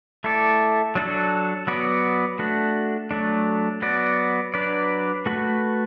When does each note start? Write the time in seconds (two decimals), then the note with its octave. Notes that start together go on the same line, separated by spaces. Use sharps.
0.24 A3 E4 A4 D5
0.95 F#3 D4 F#4 A4
1.67 F#3 B3 F#4 D5
2.39 A3 D4 F#4
3.11 F#3 A3 D4
3.82 F#3 B3 F#4 D5
4.54 F#3 D4 B4 D5
5.26 A3 F#4 B4